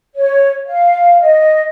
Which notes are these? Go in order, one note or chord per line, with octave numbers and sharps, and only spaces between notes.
C#5
F5
D#5